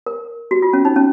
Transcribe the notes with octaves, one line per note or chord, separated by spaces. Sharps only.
A#4
F#4
F4
C#4
D#4
C#4